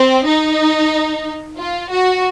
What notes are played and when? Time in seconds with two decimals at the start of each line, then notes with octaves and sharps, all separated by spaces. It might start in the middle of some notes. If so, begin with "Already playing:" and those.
Already playing: C4
0.27 D#4
1.58 F4
1.89 F#4